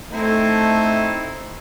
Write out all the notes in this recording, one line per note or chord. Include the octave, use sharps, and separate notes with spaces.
A3 C4 D#4 E4